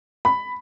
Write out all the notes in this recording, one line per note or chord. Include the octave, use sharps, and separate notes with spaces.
B5